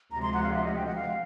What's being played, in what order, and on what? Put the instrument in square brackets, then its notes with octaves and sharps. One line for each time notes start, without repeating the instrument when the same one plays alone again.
[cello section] D2 C3 F3 G#3 [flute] A#5
[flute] C6
F#5
F5
E5
D#5
G5
F#5
F5